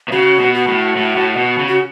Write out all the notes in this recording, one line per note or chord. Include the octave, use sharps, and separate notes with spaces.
B2
C#3 F#4
B2
F#4
A2
A2
A2
B2
C#3
F#4